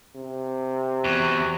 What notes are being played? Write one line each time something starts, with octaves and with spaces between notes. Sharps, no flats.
C3
E2 F#4